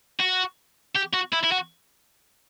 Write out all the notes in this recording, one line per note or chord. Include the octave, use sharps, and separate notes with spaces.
F#4
G4
F#4
E4
E4
F#4